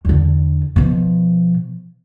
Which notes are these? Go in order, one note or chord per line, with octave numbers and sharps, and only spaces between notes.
E2 D3
B2 F3